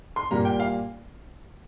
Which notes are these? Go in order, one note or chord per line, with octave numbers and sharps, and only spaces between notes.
C6
A#2 G3 A#3 A#5
G5
F5